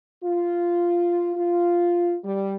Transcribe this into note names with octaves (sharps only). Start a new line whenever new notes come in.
F4
F4
G3